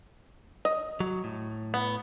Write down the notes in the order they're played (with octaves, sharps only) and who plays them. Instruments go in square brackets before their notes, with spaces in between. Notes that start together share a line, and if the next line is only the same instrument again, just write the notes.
[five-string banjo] D#5
[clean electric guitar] F#3
A2
[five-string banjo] B3